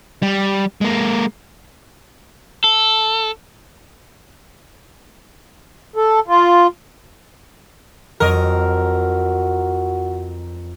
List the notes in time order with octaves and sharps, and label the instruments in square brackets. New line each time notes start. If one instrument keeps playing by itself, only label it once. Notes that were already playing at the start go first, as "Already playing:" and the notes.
[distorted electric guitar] G3
G#3 A#3
[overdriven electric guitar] A4
[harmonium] A4
F4
[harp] F2 F#3 D#5 [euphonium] F#4 [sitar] A#4